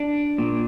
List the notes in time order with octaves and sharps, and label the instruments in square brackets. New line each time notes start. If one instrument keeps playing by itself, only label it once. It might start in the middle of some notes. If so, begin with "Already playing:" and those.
Already playing: [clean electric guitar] D4
A#2